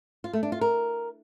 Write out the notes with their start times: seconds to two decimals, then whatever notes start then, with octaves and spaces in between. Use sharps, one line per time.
0.24 F4
0.33 A3
0.43 D4
0.52 F4
0.61 A#4